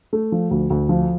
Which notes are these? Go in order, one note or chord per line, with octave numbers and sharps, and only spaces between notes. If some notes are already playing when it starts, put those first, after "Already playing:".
A3
F3
D2
D2
F3